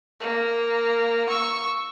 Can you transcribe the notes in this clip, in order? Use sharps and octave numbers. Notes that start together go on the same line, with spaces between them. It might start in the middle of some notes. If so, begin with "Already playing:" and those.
A#3
C#6 E6